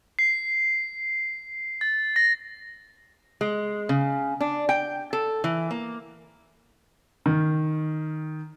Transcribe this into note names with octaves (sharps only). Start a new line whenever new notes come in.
C7
A6
A#6
G#3
C#3
D4
G5
A4
E3
A#3
D#3